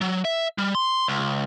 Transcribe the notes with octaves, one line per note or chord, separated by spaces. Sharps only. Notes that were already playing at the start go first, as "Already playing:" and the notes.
F#3
E5
G3
C6
C#2